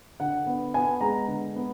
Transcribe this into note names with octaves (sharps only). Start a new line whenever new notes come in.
D3 F#5
B3
B3 G#5
G#3 A#5
D3
B3